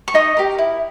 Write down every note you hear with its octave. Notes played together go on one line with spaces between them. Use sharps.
C#6
D#4 D#5 D#6
G4 A#4
E4